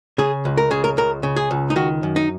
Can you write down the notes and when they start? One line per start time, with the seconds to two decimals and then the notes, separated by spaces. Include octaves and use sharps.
0.18 C#3 G#4
0.45 C#2
0.57 A#4
0.71 C#3 G#4
0.84 A#4
0.97 C#2 A#4
1.23 C#3
1.36 G#4
1.51 C#2
1.70 D#4
1.76 D#3 F#4
2.03 F#2
2.16 D#4